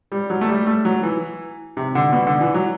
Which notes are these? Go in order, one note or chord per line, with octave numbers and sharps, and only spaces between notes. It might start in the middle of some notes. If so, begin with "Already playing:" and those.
G3
F#3
A3
G3
A3
F#3
E3
C3
D3
B2
D3
E3
F#3